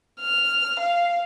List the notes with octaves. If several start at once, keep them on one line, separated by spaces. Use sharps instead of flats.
F6
F5